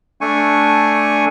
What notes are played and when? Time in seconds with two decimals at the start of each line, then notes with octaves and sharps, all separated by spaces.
0.21 A3 D4 G#5 C#6